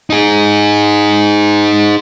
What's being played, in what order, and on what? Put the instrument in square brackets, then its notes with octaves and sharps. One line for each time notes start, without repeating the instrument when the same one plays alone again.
[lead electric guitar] D#4 G#4